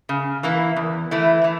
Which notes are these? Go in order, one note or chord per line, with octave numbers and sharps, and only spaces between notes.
C#3
E3 A#3 E4
E2
E3 A3 E4
E3